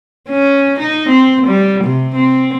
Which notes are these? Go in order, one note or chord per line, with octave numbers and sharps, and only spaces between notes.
C#4
D#4
C4
G3
C3
C4